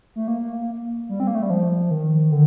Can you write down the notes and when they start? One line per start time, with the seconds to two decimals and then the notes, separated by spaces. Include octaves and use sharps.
0.16 A3
0.28 A#3
1.09 G3
1.20 C4
1.27 A#3
1.35 A3
1.43 G3
1.50 F3
1.91 D#3
2.32 D3